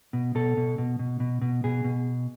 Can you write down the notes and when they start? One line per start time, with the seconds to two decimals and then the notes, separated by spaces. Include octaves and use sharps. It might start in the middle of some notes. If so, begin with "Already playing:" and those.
0.13 B2
0.35 B2 A4
0.57 B2
0.78 B2
0.99 B2
1.20 B2
1.41 B2
1.64 B2 G#4
1.84 B2